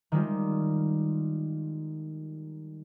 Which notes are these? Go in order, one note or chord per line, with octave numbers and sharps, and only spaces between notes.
D#3 G3 G#3 F4